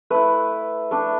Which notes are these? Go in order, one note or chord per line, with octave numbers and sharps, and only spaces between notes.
A3 E4 B4
A3 D4